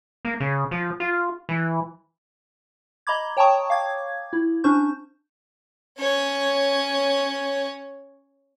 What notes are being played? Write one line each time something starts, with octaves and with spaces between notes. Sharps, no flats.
A#3
C#3
F3
F4
E3
D#5 A#5 B5 D6 G#6
C#5 G5 A5 A#5 C#6 D#6
F5 D6 G#6
E4
C#4 D4 C5 C#6 G6
C#4 C#5